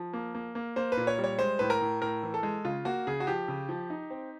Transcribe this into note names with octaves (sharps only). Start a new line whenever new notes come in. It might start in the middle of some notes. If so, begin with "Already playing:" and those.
Already playing: F3
A#3
A#3
A#3
A#3 C5
B4
A#2
C#5
G3
C#5
G#3 C5
A2 B4
A#4
A2
A2 A#4
E3
A4
G#3
C#3 F4
A#3 F#4
C#3 G#4
F#4
F3 G4
C#3
F3
D#4
C4